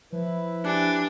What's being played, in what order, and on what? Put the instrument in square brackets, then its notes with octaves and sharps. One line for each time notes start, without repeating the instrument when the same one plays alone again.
[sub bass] F3 [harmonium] E4 B4
[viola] D4 [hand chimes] G4 G#5 F#6